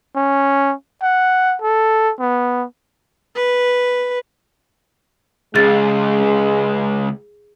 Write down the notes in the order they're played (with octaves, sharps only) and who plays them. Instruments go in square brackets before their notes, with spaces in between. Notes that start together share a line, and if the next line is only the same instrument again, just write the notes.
[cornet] C#4
F#5
A4
B3
[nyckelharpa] B4
[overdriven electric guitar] C#2 C#3 [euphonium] G#3 [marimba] G#4 A6